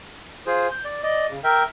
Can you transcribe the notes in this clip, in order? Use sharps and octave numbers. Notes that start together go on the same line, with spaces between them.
F4 G#4 C5
G6
D5
D5 D#5
C#3
A#4 E5 G5